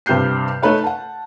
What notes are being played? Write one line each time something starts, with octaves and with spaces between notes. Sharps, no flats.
G2 C3 G4 F6 G6 C7
A3 D#4 B4 C#5
F#5 A5